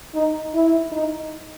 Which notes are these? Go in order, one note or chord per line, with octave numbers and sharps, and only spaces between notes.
D#4
E4
D#4